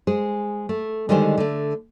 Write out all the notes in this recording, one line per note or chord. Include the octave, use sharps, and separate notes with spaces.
G#3 G#4 C5
A3
D3 D#3 G3 G#3 G4 C5
D3 A3